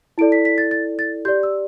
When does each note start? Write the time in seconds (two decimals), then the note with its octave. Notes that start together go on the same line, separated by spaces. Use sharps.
0.18 E4 A4 D5 D7
0.32 B6
0.45 B6
0.58 A6
0.71 A6
0.99 A6
1.25 G4 D5 G6
1.43 E6